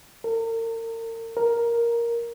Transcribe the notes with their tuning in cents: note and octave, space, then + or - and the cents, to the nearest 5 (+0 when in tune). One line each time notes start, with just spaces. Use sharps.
A#4 -40
A#4 +5